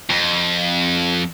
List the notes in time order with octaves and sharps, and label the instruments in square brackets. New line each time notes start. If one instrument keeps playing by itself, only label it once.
[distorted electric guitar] F2